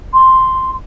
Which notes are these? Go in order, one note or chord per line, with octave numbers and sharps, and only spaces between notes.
C6